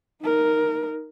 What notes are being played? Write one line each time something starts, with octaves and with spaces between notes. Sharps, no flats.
D#4 A#4